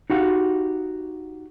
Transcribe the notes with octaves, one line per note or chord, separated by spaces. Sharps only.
D#4 F#4 G4 F5